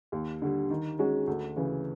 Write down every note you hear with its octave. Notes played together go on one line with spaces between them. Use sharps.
D#2
D3 G3
D#3
G#3 C#4 F#4
D2
C#3 E3